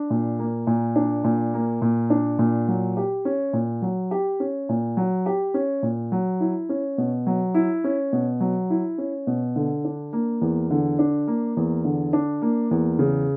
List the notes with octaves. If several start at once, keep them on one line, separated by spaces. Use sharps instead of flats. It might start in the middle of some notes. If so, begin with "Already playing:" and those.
Already playing: D4
A#2
A#3
A#2
D4
A#2
A#3
A#2
D4
A#2
F#3
G4
C#4
A#2
F#3
G4
C#4
A#2
F#3
G4
C#4
A#2
F#3
E4
C#4
B2
F#3
E4
C#4
B2
F#3
E4
C#4
B2
D3
D4
A#3
E2
D3
D4
A#3
E2
D3
D4
A#3
E2
C#3